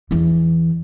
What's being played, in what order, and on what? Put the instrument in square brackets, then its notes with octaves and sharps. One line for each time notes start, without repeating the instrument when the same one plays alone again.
[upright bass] E2 E3